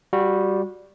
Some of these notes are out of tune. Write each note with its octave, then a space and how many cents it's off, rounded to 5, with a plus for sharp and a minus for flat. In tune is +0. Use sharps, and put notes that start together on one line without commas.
G3 +0 F#4 -20